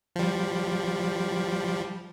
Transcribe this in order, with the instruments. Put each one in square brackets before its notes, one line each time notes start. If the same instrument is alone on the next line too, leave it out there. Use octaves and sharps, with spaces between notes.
[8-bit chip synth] F3 G3